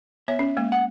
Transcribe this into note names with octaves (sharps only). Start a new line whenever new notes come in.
B3 C#5 E5
C#4
G#3 A#3
F#5